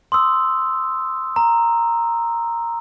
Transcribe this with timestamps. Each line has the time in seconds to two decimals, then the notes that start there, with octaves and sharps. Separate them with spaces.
0.12 C6 D#6 E6
1.36 A#5